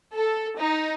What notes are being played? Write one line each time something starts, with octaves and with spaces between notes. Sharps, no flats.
A4
D#4